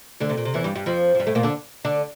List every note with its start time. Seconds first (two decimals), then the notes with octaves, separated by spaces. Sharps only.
0.20 D2 D3
0.30 C3
0.37 A#2
0.45 C3
0.54 E2 E3
0.64 G2 G3
0.76 G2 G3
0.86 F2 F3
1.15 F3
1.19 G2 G3
1.27 A2 A3
1.35 A#2 A#3
1.43 D3 D4
1.85 D3 D4